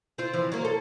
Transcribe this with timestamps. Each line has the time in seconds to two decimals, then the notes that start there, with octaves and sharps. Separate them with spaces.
0.18 C4 F4
0.33 E3 F3
0.52 F#3 A#3
0.65 A4